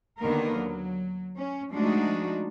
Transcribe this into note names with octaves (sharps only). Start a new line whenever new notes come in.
D#2 D3 D#3 A#3 B3 A#4
F#3
C#4
F3 G#3 A3 D4 D#4 F#4